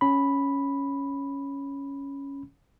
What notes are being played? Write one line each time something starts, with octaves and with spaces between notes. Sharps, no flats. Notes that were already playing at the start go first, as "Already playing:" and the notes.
C#4 B5